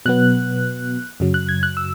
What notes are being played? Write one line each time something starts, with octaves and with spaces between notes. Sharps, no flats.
B2 F#3 B3 F#6
F#2 C#3 F#3
F#6
G#6
F#6
E6